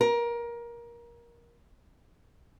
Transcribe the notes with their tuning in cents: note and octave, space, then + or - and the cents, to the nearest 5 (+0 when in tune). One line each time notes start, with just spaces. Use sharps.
A#4 +20